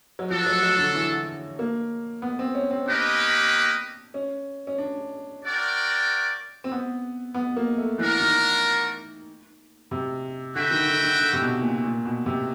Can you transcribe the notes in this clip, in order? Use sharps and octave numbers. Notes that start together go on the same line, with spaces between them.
F#3
F3 D4 F#4 A4
F#3
F#3
D3
E3
A#3
B3
C4
C#4
C4
A#3 D4 D#4 G4 B4 D#5
C#4
C#4
D4
F#4 A#4 D5 G5
C4
B3
B3
A#3
A3
E3 D4 F#4 A#4
D#3
C3
D3 F#4 B4 E5 G5
D#3
D3
D3
D3
C3
B2
A#2
A#2
B2
C3